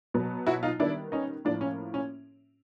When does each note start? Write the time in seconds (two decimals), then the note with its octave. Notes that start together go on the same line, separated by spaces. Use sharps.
0.14 B2 F#3 B3
0.47 E4 F#4
0.63 D#4 F4
0.80 D#3 G3 B3 D4 E4
1.12 C#4 D#4
1.45 A2 F3 A#3 D4
1.61 C#4
1.94 C#4